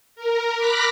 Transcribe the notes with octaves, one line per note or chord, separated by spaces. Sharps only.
A#4
B5 D6 F6 F#6 A#6 B6